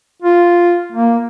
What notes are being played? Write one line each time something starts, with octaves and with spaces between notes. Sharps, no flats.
F4
A#3